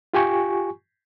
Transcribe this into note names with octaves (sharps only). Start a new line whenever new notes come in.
F4 G4 G#5 C#6